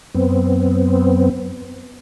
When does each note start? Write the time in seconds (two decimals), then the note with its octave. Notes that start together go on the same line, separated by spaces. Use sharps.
0.15 F#2 B3 C4